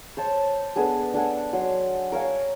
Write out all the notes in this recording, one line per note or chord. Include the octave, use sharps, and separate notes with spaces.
C5 C#5 A5
B3 D4 G#4 A4
D4 A4 F#5 G#5
F#3 C6
A#4 C#5 F5 G#5